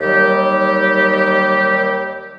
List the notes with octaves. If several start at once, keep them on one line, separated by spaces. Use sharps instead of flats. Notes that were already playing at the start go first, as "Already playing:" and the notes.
D#2 D#3 F#3 G3 G4